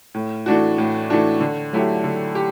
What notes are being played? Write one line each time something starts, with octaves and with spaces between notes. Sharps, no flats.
A2
E3 A3 D4 F#4
A2
E3 A3 D4 F#4
D3
F#3 A3 E4 G4
D3
G4